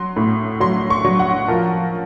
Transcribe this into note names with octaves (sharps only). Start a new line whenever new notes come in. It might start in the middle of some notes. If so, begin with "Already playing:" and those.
Already playing: F#3 C6
A2
F#3 C6
C#6
F#3
F#5
F3 A#4